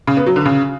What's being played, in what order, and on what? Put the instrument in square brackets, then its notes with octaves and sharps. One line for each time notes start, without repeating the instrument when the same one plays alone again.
[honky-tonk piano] C#3
B3
F#3
D3
C#3